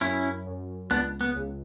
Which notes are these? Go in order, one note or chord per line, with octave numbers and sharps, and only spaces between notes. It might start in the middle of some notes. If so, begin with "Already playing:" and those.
F#2 C#4 E4
F#2
C#2 B3 D4
B3
C#2